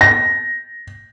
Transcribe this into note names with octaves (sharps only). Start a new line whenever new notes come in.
A#6